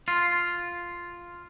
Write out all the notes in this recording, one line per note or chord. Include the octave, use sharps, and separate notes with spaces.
F4